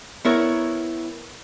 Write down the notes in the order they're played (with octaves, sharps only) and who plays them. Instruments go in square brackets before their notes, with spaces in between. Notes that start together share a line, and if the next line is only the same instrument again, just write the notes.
[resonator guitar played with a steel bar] B3 E4 A#4 C#5